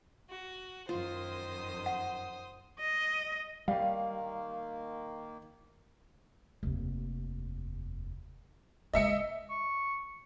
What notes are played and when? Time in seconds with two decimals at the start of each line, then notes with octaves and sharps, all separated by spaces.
0.30 F#4
0.89 F#2 D#3 F4 C5 D#6
1.86 F#5
2.80 D#5
3.68 D#3 G3 A#3 F5
6.63 F1 D#2
8.94 D#3 G#3 D#5 E5 C#7
9.50 C#6